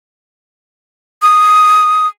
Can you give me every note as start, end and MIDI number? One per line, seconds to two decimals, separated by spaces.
1.22 2.07 87